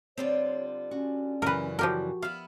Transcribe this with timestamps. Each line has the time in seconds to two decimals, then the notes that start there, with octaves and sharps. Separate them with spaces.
0.18 D3 G3 C4 F4 C#5
0.91 C#4 F#4
1.42 F#2 C#3 E3 A#4 B4
1.79 F3 F#4 G4 A#4
2.22 B3 E4 F5